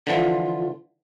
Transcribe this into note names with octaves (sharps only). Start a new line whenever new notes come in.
D3 E3 F3 F4